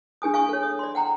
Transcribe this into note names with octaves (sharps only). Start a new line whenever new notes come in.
D4 G#4 G#5 D#6
F5 G#5 C#6 D#6
A4 C#5
D#6
D5 C6
F#5 G5 A#5